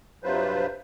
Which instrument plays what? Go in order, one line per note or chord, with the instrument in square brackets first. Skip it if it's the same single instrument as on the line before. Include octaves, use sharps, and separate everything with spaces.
[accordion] G2 C3 F#3 F4 B4 C5